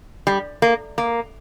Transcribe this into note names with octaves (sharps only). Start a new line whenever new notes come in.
G3
A#3
A#3